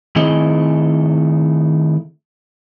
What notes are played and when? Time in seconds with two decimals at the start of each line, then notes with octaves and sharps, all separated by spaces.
0.16 D#3 A3 C4 E4 G#4 D#5